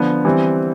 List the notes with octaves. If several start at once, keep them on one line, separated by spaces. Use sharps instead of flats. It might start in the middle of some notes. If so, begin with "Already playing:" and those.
Already playing: D3 F3 B3
E3 G3 C4